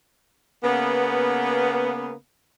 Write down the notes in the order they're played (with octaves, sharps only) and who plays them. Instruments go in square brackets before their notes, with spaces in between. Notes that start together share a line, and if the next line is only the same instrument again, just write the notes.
[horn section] C#3 A#3 B3